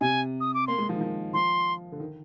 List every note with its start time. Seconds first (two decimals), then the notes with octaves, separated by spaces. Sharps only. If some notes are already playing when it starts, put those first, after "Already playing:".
0.01 C3 G#5
0.41 D#6
0.54 D6
0.67 A#3 C6
0.78 G#3
0.89 F3
0.95 D#3
1.01 F3
1.34 F3 C6
1.92 D3
2.00 D#3